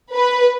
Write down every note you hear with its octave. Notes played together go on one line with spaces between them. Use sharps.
B4